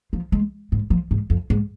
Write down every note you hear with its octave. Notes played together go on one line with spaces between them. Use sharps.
F3
G#3
G#2
F3
G#2
F2
G#2